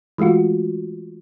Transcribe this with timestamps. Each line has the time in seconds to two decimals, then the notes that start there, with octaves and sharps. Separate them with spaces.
0.18 E3 G#3 A3 F4 F#4